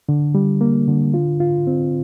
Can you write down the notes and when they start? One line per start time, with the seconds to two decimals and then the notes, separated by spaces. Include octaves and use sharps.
0.09 D3
0.35 G3
0.61 A#3
0.88 D3
1.14 F4
1.40 F4
1.67 C4